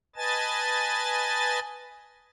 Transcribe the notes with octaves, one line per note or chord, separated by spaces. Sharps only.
B4 D#5 G#5 A5 A6